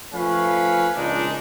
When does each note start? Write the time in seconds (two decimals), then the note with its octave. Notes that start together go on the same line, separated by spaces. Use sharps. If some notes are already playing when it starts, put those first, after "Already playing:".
0.14 F3 A3 C#4 B4 F5
0.96 C#2 A#2 G#3 D4 D#4